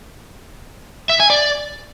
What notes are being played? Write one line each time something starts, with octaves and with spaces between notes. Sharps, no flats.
E5
G#5
D5